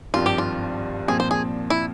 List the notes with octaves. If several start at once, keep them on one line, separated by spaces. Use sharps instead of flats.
G#1 G2 F3 C4 F4
G4
F4
A#2 F3 C4 G#4
C5
G#4
E4